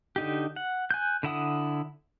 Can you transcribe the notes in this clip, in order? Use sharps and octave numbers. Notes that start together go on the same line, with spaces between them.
D3 D#4 G4
F#5
G#5 F#6 G6
D3 E4 F#5 D#6